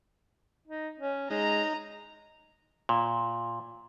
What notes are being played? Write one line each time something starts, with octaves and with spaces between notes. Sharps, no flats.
D#4
C#4
G#3 D#4 A#5
A#2